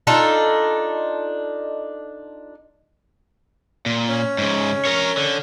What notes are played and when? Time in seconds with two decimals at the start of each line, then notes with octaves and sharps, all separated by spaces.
0.07 D4 D#4 F4 A4
3.86 A#2
4.09 C#4
4.38 G#2 C#3
4.85 A#4 C#5
5.17 D3